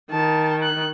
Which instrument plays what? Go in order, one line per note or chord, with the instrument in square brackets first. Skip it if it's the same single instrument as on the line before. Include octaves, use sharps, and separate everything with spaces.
[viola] D#3 [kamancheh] A5
[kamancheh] F#6